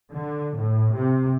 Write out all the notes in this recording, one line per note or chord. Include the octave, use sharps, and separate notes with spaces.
D3
A2
C3